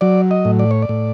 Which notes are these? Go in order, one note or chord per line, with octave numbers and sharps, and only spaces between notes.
F#3 D5
D#5
A2
D5
C#5
D5
A2